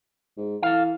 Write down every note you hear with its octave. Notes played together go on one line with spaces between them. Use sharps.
G#2
E3 A4 F5